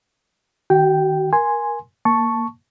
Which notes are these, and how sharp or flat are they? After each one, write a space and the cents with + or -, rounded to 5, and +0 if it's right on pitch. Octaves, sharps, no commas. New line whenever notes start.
D#3 +0 F#4 +40 G5 +0
A#4 +15 G#5 +0 C6 +0
A#3 +0 A5 +0 C#6 +0